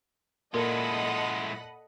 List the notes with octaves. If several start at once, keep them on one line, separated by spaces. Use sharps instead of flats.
A#2 G#3 E4 A4 A#4 D#5 F#5 B5